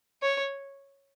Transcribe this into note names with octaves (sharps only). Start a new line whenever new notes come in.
C#5